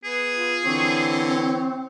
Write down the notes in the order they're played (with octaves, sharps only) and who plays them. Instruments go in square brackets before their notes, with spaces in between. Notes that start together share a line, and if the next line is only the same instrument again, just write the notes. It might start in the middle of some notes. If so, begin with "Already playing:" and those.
[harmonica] B3 [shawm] G#4
[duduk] F4
[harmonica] D3 E3 C#5 [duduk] C4